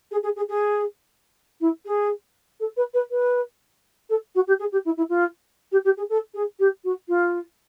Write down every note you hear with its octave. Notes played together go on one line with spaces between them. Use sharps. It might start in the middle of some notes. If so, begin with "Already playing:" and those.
G#4
G#4
G#4
G#4
E4
G#4
A4
B4
B4
B4
A4
F#4
G4
G#4
G4
E4
E4
F4
G4
G4
G#4
A4
G#4
G4
F#4
F4